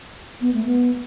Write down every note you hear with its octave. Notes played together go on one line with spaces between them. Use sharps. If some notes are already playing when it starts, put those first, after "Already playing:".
B3
A3
B3